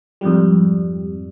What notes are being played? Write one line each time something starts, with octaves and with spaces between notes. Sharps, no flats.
F2 G#2 G3